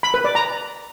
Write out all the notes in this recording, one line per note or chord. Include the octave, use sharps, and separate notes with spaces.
B5
B4
D5
A#5